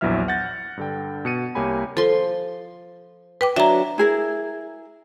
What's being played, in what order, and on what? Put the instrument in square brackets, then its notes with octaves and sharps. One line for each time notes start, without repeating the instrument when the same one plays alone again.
[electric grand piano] A#1 E2 E3 F#3 E5 F6
F#5 G6 A6 A#6
G2 D3 G5
B2 C#7 D#7
C2 A#3 G4 C#5 G#5 B5
[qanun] F3 C6 [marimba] A4
[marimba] B4 G5 D6
[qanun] F#3 D4 [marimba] E5 A#5
[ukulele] E4 G#4 A#4